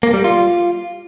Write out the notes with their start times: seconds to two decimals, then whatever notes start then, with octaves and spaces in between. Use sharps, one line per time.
0.03 A#3
0.14 G3
0.24 F4